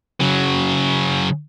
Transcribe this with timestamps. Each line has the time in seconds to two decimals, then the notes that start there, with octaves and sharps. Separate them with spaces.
0.20 C#3 F#3